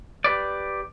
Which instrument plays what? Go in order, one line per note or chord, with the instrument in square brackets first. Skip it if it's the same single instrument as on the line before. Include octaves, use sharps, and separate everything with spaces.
[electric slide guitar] G4 B4 D5